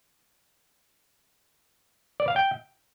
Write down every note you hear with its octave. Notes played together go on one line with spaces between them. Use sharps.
D5
F5
G5